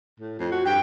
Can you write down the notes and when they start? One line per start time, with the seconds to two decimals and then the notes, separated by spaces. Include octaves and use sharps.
0.20 A2
0.39 F2
0.52 F#4
0.66 G2 G5